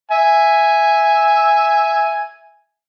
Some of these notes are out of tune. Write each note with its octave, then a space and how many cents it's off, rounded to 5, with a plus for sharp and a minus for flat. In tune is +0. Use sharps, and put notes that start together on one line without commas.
E5 +0 G#5 +0